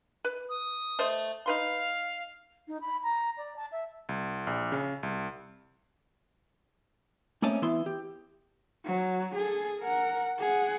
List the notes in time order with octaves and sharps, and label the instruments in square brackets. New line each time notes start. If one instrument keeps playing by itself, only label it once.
[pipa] B4
[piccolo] D#6
[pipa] A3 C5 D#5
[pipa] D#4 B4 C6 [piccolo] F5
[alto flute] D#4
B5
A#5
D5
A5
E5
[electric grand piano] C2
A#1
C#3
C2
[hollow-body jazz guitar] A3 A#3 C4 C#4 D#5 A5
E3 B3 E4 E5 C6
G4
[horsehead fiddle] F#3
G#4 A4
A#4 F#5
G#4 F#5